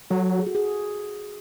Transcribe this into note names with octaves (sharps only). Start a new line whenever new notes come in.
F#3 A4
G#4
F#4
G#4